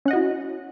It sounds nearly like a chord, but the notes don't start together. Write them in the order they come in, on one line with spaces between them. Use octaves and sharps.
C#4 F#5 D#5 F#4 E4